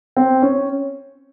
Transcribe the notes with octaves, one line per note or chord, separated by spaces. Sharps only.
C4
C#4